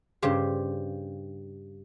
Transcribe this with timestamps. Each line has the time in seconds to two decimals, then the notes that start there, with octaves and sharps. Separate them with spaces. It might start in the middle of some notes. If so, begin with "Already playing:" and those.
0.22 G2 C#3 G4 C5